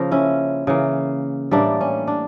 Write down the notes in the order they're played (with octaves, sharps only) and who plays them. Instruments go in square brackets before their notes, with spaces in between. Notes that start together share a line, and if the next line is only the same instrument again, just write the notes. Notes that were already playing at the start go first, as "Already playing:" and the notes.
Already playing: [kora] C#3 F3 A#3 A#4
C#4 E4
C#3 E3 A#3
A2 E3 G3 A#3 D4
C#4
D4